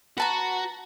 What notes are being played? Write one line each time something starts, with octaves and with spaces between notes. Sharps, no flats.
F#4 B4 A5 A#5